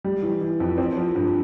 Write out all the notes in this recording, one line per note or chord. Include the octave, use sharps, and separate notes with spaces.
G3
E3
E3
F2
C4
F3
G2